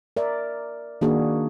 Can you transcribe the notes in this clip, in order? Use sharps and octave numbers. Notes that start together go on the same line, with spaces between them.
A#4 D5 E5
D#3 A#3 D4 F#4 G#4